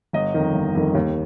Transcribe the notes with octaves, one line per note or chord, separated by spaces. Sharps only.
G1 D#5
F2 D#3
G1
F2 D#3
D#2